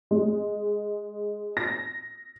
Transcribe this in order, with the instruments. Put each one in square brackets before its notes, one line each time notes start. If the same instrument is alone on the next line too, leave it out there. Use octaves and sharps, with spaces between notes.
[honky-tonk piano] G#3
A#6